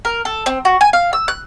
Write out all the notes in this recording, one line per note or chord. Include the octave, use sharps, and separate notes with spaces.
A#4
A4
C4
F#4
G#5
F5
E6
F#6